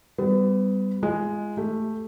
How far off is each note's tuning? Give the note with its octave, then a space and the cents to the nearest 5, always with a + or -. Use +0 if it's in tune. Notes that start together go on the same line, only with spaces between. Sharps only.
G3 +0 B3 +35
G#3 +0 F4 -30 D#5 +0
A3 +0 G4 +0